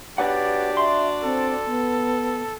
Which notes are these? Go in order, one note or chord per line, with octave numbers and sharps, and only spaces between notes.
D4 F#4 G4 B4 C#5 D5 F#5
E5 C6
C4 A4
B3